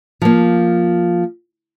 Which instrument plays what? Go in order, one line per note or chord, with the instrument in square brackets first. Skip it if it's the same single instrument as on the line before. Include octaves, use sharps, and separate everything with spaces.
[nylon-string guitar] F3 A#3